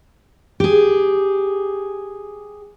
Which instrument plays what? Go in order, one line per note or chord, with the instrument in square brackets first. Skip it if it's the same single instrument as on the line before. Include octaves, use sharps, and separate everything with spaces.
[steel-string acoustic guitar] G4 G#4